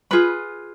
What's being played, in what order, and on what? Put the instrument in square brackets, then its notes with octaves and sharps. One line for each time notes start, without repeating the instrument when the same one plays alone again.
[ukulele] F4 G#4 B4 B5